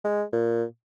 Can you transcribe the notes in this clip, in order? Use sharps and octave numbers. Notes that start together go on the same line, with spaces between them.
G#3
A#2